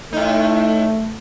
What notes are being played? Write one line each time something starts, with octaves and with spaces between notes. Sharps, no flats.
A2 A3 D#4